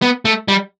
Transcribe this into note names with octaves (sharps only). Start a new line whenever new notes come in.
B3
A3
G3